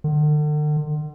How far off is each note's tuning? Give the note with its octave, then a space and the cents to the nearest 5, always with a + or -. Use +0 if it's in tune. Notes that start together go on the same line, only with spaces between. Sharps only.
D3 +40